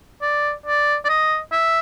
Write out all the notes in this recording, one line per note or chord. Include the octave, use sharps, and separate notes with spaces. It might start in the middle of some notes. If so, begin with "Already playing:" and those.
D5
D5
D5
D#5
E5